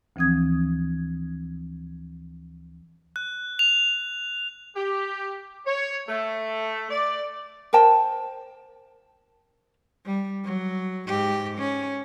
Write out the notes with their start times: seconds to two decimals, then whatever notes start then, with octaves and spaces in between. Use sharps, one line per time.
0.16 D2 E3 F3 C4 D#6 G#6
3.16 F#6
3.59 F7
4.76 G4
5.66 C#5
6.09 A3
6.91 D5
7.73 A#4 C5 G5 A5
10.05 G3
10.44 F#3
11.07 G#2 G4
11.58 C#4